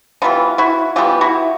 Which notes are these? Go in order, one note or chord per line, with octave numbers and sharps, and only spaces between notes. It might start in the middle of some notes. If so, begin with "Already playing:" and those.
E3 G3 B3 D#4 F4
E4 F#4
E3 G3 B3 F4 G4
E4 F#4